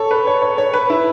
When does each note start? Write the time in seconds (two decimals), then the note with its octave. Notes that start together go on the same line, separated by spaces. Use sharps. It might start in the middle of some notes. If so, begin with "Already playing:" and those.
Already playing: A4 C#5
0.11 B4
0.27 C#5
0.42 C#5
0.58 C#5
0.73 B4
0.90 E4